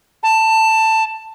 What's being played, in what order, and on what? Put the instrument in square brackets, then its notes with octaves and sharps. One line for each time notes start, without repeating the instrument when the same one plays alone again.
[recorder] A5